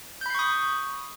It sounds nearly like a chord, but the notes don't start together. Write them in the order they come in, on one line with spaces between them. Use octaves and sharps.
G6 B5 C7 C#6 D#6